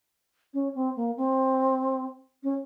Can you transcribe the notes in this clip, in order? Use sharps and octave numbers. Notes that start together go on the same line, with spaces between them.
C#4
C4
A#3
C4
C#4